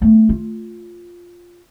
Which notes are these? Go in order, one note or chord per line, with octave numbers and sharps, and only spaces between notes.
A3 B3
F4